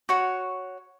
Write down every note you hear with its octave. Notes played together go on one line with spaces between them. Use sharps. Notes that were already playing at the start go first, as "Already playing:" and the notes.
F#4 C#5 F#5